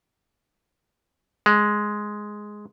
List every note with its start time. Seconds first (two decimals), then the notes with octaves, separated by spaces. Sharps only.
1.46 G#3